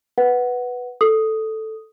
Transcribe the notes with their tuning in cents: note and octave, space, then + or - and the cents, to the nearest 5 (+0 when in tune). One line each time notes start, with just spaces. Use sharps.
B4 +0 F#5 +0
A4 +0 D#6 +0